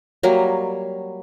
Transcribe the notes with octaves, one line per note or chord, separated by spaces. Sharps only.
F#3 G3 A#3